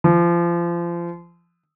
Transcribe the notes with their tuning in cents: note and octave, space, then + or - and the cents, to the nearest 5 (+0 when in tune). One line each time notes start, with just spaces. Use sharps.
F3 -30